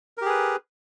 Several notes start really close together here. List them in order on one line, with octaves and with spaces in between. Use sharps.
A#4 G4 G#4 B4